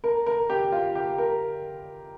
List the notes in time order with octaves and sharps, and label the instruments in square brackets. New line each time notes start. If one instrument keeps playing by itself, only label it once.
[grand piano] A#4
A#4
G4
F4
G4
A#4